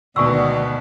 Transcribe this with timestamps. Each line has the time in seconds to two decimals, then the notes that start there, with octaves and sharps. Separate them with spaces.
0.16 D2 B2 D#3 B3 D5 G#5 C#6 E6